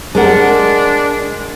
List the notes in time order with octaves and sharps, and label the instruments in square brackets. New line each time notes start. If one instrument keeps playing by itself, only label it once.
[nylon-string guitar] G#3 A#4 F#5 [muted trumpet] D4